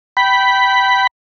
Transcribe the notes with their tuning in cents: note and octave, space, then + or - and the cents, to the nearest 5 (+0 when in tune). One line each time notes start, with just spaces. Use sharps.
G5 -20 B5 +0